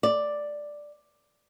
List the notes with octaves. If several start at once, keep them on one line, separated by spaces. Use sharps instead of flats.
D5